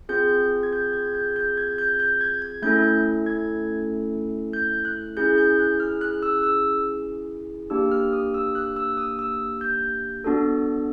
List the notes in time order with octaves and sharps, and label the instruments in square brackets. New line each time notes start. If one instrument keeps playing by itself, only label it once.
[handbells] C4 F4 G#4 G6
G#6
G6
G#6
G6
G6
G#6
G6
G6
G#6
G#6
A3 C#4 E4 A4 G6
G#6
G6
F#6
C#4 E4 G#4 G6
G6
F#6
F6
F#6
E6
E6
A#3 D4 G4 E6
F6
D#6
E6
F#6
E6
D#6
E6
G6
B3 D4 F#4 A4